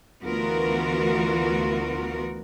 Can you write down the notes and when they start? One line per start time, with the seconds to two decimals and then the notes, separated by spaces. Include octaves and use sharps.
0.24 D2 E3 B3 F4 F#4 A#4